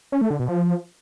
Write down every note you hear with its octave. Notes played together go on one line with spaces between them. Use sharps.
C#4
A3
D3
B2
F3